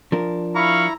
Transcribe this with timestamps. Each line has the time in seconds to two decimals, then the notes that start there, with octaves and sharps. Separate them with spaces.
0.12 F3 D4 A#4
0.55 E4 F5 A#5 B5 C#6